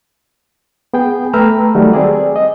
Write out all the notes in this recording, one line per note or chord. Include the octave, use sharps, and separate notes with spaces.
B3 G#4 G5
A3 B4 G5 A#5 E6 F6
D#3 F#3 G3 A3 F#4
C4 G#4 D5
D#5